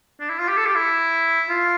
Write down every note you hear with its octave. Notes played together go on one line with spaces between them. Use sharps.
D4
E4
F4
G4
A4
G4
E4
F4